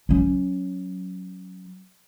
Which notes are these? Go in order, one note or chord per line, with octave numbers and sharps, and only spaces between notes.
F#3 C#4